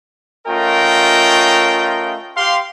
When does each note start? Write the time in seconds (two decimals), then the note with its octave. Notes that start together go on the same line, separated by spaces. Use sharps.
0.47 A3 C#4 F4 A#4 D#5 G5
2.37 G4 F5 C6